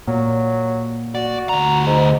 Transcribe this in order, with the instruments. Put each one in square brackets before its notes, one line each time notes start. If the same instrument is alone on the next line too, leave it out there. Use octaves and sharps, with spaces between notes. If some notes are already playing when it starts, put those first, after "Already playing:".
[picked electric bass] A#2 [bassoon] F#3
[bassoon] F#4 [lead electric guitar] D5
[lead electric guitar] D2 A#5
[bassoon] G#2